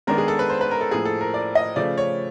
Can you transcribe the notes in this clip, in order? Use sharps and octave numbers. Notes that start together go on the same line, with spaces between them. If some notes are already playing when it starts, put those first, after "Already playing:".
D#3 G#3 B3 D4 A#4
G#4
A4
B4
C5
B4
A#4
A4
A2 F3 A#3 G#4
A4
A#4
D5
D#5
C#3 F3 A3 D5
C#5